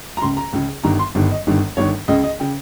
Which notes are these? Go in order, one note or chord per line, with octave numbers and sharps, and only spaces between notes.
A#5
C#2 C#3 C6
A#5
C#2 C#3
G1 G2 D#3 A#5
C6
G1 G2 D#3
D#5
G1 G2 D#3
G1 G2 D#3 C#5
C#2 C#3 D#5
D#5
C#3 G5